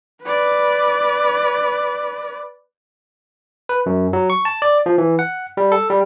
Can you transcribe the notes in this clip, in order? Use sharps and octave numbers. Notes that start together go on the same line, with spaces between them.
B4 D5
B4
F#2
F#3
C#6
A5
D5
F3
E3
F#5
G3
A4
G3